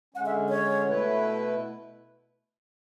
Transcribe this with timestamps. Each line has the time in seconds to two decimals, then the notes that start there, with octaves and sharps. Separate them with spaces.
0.14 D3 G#3 C#4 F#5
0.26 E5
0.49 C#5
0.84 B2 A3 E4 B4